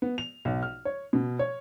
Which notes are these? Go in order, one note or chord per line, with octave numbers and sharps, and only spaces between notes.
B3
F7
B1
F6
C#5
B2
C#5